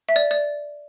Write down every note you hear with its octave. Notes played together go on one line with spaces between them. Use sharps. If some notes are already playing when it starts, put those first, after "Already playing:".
E5
D5
D5